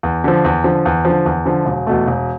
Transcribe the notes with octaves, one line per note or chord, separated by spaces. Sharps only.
E2
D3 F3
E2
D3 F3
E2
D3 F3
E2
D3 F3
E1
E2 B2 A3
E1